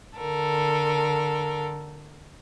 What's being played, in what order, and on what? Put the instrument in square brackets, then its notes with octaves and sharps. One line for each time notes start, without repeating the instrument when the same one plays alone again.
[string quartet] D3 A4 A#4